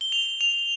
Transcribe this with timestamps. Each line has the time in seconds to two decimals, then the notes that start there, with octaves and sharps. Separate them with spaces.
0.01 G7
0.12 F7
0.41 F7